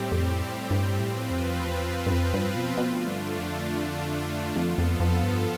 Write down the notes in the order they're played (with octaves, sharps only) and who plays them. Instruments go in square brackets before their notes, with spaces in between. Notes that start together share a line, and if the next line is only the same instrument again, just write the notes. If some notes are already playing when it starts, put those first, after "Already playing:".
Already playing: [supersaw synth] A2 G3 C4 G4
[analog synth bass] F2
G2
[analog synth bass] A2 [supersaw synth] F3 C4 F4 B4
[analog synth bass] F2
E2
F2
G2
F2
G2
B2
[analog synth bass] B2 [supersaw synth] D3 A3 D4 F4
[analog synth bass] G2
F2
[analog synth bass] F2 [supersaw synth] F3 B3 F4 A4
[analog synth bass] F2
F2
G2